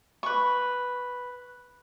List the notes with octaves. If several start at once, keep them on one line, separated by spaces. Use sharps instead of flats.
B4 C#6